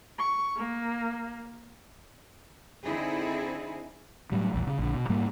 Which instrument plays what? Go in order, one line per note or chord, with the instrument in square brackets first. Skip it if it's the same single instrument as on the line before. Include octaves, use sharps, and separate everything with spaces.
[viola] C#6
A#3
[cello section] D3 C4 D#4 E4 G#4
[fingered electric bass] A2 F#3 G3
A#1 E2
C#3
A#1 D3
B2
G#2 G3 A#3